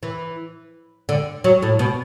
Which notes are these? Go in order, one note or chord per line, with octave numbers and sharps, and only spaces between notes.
E3
D3
F#3
A2
B2